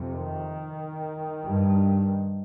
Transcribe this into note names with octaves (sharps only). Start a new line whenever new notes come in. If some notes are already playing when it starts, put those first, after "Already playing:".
Already playing: F2 C3
D#3
G2